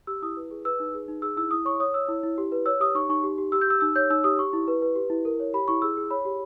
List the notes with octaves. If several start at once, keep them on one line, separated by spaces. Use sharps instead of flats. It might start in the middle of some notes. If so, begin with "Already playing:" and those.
G4 E6
E4 D#6
B4
G#4
B4 E6
D#4
G#4
D#4
G#4 E6
E4 E6
E4 D#6
C#5 C#6
C#5 D#6
C#5 E6
E4
E4
G4
B4
C#5 E6
G4 D#6
D#4 C#6
D#4 C#6
G4
G4
G4 E6
G6
G4 E6
D#4 E6
C#5 G6
D#4 E6
G4 D#6
G4 C#6
E4
B4
B4
G4
E4
A#4
C#5
G4 B5
E4 C#6
G#4 E6
G#4
C#5 B5
G4